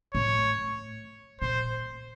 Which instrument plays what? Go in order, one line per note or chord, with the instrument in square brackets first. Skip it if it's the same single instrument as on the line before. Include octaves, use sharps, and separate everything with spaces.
[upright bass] A2 [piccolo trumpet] C#5
[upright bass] A#2 [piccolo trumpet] C5